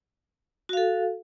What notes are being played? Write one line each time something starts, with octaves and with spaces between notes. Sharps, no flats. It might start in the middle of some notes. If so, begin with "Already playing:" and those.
F#4 A4 F5